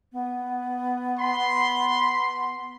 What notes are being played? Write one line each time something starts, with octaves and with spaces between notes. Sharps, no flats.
B3
B5 C6